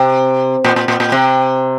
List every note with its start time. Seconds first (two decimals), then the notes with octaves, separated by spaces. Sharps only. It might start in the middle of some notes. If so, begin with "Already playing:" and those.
Already playing: C3
0.64 A#2
0.76 A#2
0.88 A#2
1.00 A#2
1.12 C3